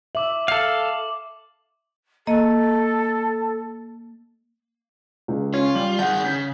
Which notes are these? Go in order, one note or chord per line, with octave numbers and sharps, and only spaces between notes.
E5 D6 F#7
A4 F5
A#3 A4 D#5
C#2
C#4 F4
G3 F#7
D#3 G#4 F#5 G6
C#3 B6